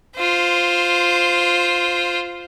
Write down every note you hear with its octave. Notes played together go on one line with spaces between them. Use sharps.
F4 C5